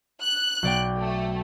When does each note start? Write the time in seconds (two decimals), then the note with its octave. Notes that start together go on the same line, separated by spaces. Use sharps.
0.21 F#6
0.63 B1 D5 G5
0.97 A3